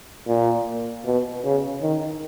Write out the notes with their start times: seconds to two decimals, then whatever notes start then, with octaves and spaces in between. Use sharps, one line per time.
0.28 A#2
1.05 B2
1.44 C#3
1.82 D#3